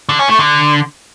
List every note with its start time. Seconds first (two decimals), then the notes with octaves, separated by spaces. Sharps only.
0.09 D3
0.19 C#4
0.29 A3
0.39 D3